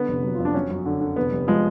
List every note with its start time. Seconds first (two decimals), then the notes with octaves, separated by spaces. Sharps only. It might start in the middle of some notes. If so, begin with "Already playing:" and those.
Already playing: D3 B3
0.08 F1
0.24 F#3
0.35 F2 F4
0.45 D4
0.54 F#3 C#4
0.70 F#2
0.86 D3
1.01 D3
1.16 F1 B3
1.32 F1
1.48 F3 G#3